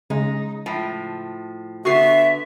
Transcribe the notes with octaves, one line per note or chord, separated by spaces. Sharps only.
C#3 G#3 D#4
A2 F3
D3 B3 F#4 E5 C#6 C7